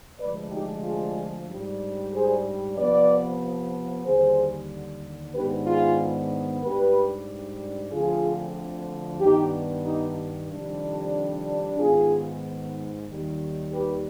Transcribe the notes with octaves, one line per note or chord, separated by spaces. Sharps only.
D2 C3 F3 G#3 D4 B4 D5
D#4 G4
F4 G#4
G#2 G3 D4
G#4 C5
C3 F3 B3 B4 D5
D#2 D3 G3 G#4 C5
G#2 D#3 B3 D4 G4 B4
F4 G#4
G#2 G3 D4 G4 B4
D2 D3 F3 C4 F4 G#4
G2 D#3 B3 D4 D#4 G4
D#4 G4
F2 C3 D#3 G3 D4
G#2 D#3 B3 F4 G#4
D#2 D#3 G3
G4 B4